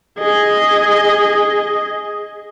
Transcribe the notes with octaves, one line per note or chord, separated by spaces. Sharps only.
G#4 D#5